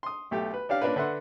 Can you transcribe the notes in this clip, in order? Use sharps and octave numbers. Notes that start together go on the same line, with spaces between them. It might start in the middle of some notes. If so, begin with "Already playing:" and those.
C6 D#6
B1 A3 G4
B4
C#4 D4 G4 F5
A#3 C#4 D4 F4 A#4 B4
D3 B4 E5 F#5 C6